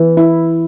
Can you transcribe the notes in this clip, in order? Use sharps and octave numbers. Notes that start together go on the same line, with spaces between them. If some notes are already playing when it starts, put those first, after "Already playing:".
Already playing: E3
E4